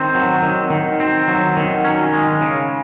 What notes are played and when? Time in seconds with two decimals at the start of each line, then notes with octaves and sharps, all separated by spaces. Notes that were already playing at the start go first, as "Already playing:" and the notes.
Already playing: D#3 C4
0.15 F#3
0.42 D#3
0.70 D#3
1.00 C4
1.28 F#3
1.57 D#3
1.84 C#4
2.14 G#3
2.41 C#3